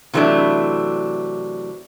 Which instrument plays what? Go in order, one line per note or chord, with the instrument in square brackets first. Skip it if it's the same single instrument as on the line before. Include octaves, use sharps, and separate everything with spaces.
[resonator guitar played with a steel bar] C3 E3 F#3 A3 D4